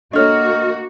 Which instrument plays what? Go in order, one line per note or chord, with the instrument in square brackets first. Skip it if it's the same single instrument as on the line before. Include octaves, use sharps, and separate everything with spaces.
[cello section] A#3 F#4 [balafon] D4 A4 C#5 [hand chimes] D#5 F6